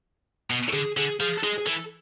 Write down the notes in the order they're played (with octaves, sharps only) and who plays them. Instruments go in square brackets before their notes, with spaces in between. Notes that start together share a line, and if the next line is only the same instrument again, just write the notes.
[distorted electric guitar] B2
[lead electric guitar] A4
[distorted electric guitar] D3 [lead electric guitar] G#4
[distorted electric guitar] D3 [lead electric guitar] G#4
[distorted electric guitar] F3 [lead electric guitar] G#4
[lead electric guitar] A4
[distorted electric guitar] G#3 [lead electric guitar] G#4
[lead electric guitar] G#4
[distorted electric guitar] E3 [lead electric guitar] A4